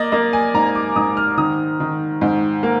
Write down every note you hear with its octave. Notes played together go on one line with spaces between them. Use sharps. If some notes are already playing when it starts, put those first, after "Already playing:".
Already playing: A#3 D5 D#5
A#3 D#5
G#5
G#2 A#5
D6
G#2 D#6
F6
D#3 D#6
D#3
G#2
A#3